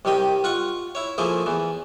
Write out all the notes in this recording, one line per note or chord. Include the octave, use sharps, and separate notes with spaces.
C2 D#3 G3 G4 D#5
F4 F#5 C#6
E4 C#5
F3 A3 A#3 E4 G#4
E2 E3